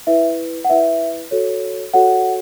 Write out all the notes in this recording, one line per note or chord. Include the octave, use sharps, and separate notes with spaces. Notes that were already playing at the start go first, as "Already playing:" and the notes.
E4 B4 E5
F#5
E4 B4 E5
F#4 A4 C#5
F#4 A4 C#5 F#5